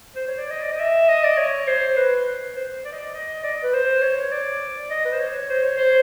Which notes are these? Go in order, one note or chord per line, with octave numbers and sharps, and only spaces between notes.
C5
C#5
D5
D#5
D5
D#5
E5
D#5
D5
C#5
C5
B4
C5
D5
D#5
D5
D#5
D5
B4
C5
C#5
D5
D#5
B4
C5
C#5
C5
C#5
C5